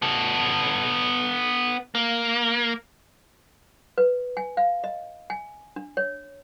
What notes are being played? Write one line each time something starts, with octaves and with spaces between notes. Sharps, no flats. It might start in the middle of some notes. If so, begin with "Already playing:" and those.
B3 A4
A#3
B4
G#5
F5
D#5
G#5
D4
C#5